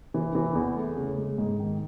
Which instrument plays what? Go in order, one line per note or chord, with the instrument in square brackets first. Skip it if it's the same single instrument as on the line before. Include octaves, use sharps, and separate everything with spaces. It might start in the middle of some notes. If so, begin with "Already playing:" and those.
[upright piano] E3
E3
E2
A3
C#3
G#3
G#2
D#3